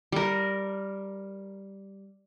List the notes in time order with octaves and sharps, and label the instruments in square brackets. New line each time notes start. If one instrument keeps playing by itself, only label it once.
[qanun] G3 A#4